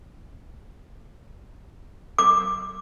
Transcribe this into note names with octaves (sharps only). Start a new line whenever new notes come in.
D6